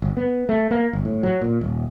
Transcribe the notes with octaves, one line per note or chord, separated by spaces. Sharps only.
G1
B3
A3
A#3
G1
A2
F#3
A#2
D#1